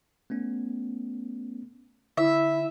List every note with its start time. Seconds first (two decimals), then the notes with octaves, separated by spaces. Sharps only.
0.30 A3 B3 C#4
2.17 D3 E4 E5